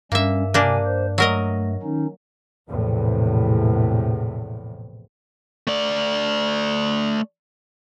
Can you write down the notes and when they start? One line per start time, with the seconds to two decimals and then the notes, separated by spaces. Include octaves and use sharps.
0.12 G2 G3 A#3 C#4 E5
0.54 C3 A#3 D4 G#5
0.85 C5
1.18 F#3 A3 A#4 D#5
1.83 D#3 C#4 D#4
2.70 A#1 E2 A2 C3 E3
5.67 A3 D5